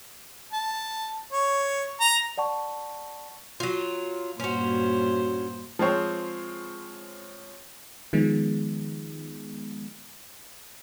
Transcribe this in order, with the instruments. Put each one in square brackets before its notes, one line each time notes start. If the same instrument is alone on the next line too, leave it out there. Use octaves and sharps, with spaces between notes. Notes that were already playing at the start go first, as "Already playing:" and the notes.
[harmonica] A5
C#5
A#5
[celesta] D5 F#5 A5 C#6
[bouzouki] F#3 F4
[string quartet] G2 A#2 C5 [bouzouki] C#4 F#4
[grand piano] F3 G#3 C4 C#5
[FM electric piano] D#3 F3 G#3 B3